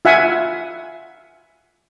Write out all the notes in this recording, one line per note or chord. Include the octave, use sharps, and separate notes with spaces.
F4 E5 F#5 G#5